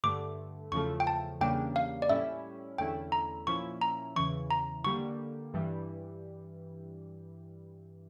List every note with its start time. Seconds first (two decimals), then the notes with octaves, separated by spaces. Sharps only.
0.04 G2 D3 A3 D6
0.72 E2 C#3 F3 A3 C#6
1.00 G5
1.07 A5
1.40 E2 C#3 G3 A#3 D4 G5
1.76 F5
2.02 D5
2.09 A2 G3 C#4 E4 E5
2.78 E2 D3 A3 C#4 E4 G5
3.12 A#5
3.47 A#2 F3 C#4 E4 C#6
3.81 A#5
4.16 E2 C#3 E3 C#6
4.51 A#5
4.84 D3 G3 A#3 C#6
5.54 G2 E3 G3